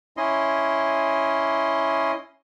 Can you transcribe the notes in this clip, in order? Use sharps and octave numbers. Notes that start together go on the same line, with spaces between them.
C#4 E4 D#5 C6